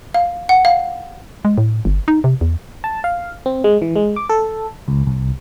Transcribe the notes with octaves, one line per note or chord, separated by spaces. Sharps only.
F5
F#5
F5
G#3
A2
G1
D#4
C3
E2
A5
F5
C4
G#3
E3
G#3
D6
A4
C#2
C2